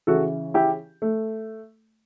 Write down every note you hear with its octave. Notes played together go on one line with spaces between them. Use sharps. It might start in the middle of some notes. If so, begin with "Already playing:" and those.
C#3 E3 F#4 A4
E4 G4
A3